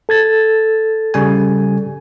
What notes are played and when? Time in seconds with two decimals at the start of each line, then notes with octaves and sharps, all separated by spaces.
0.09 A4 G#6 A6
1.14 C#3 G3 G#5